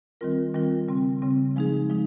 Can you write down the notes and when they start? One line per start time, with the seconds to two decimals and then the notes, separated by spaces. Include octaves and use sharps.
0.21 D#3 G3 C4 F4 A#4
0.54 D#3 G3 C4 F4 A#4
0.88 C#3 G3 C4
1.22 C#3 G3 C4
1.56 F3 G#3 D#4 G#4
1.90 F3 G#3 D#4